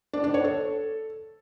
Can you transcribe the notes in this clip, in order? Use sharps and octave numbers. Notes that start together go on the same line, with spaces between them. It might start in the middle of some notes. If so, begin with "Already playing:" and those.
D4
D4
C#5
A4